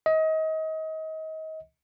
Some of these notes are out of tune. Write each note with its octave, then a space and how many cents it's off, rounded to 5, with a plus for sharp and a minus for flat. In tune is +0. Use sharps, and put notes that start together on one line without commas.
D#5 +30